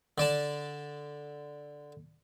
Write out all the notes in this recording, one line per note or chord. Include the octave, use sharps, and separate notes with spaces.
D3 D5 A5